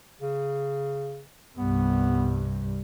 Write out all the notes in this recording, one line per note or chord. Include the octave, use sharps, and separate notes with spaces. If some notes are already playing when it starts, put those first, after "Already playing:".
C#3
C2 G2 B3